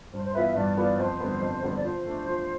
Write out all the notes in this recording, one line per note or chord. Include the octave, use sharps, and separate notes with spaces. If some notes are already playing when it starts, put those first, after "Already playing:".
G2 C5
C5
E3 B3 F4 B4 E5
E5
G2 D5
E3 B3 F4 B4 D5
F2 C5
D3 G3 B3
F2
D3 G3 B3
D5
F3 C5
A3 D4
F3